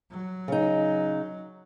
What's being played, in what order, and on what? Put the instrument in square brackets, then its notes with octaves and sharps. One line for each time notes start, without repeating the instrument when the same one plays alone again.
[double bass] F#3
[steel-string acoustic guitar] C#3 D#4